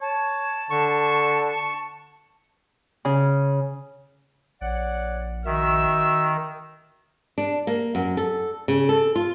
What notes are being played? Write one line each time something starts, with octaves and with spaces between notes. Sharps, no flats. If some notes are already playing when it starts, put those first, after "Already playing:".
C#5 A5
D3 C#6
C#3
A#1 C#5 D5 F#5
D#3 F#4 E5 E6
D4
A#3
F#2
A4
C#3
A4
F4